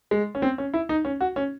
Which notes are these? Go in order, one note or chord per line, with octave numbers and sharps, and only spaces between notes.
G#3
C#4
C4
C#4
E4
D#4
C#4
F#4
C#4